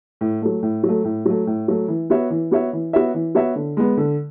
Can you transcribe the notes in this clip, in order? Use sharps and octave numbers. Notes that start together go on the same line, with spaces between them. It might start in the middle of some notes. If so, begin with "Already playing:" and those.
A2
F#3 A3
A2
F#3
A3
A2
F#3 A3
A2
F#3 A3
E3
B3 F#4 C#5 E5
E3
B3 F#4 C#5 E5
E3
B3 F#4 C#5 E5
E3
B3 F#4 C#5 E5
D3
G#3 B3
D3